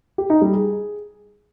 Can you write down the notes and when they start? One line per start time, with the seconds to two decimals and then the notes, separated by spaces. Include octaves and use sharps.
0.18 G4
0.30 D#4
0.42 G3
0.53 G#4